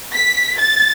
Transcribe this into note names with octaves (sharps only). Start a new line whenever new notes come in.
B6
A6